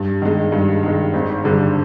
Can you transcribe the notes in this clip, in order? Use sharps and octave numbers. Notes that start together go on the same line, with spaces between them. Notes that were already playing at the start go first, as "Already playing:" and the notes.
Already playing: G2
D#3 G#3
G2
D#3 G#3
G#1
G2 D3 G3